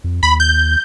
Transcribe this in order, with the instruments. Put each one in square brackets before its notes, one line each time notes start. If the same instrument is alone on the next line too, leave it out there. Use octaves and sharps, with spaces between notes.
[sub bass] F2
[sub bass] D#2 [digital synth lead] B5
[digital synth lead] G6